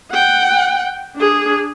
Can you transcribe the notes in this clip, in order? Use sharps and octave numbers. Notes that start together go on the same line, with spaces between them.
F#5 G5
D4 G#4